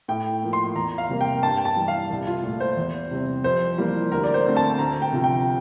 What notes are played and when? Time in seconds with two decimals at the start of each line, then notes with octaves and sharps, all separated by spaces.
0.08 A2 G5
0.42 F3 A#3
0.53 C6
0.76 E2 A#5
0.98 F5
1.09 C3 G3 A#3
1.21 G5
1.43 G2 A5
1.57 G5
1.65 A5
1.76 E3 G3
1.88 F5
2.10 C2
2.27 F4
2.44 A#2 A3
2.60 C5
2.77 E2
3.11 C3 G3 C4
3.44 F2 C5
3.78 E3 G3 A#3
4.12 D2 A#4
4.24 D5
4.34 C5
4.45 D3 A3 C4
4.56 A5
4.79 D2 A#5
5.02 G5
5.12 C3 F3
5.24 G5